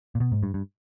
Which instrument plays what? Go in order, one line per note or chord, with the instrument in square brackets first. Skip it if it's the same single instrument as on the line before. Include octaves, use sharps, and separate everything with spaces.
[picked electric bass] A#2
B2
G#2
G2
G2